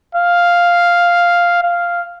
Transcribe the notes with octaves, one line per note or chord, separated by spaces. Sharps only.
F5
F5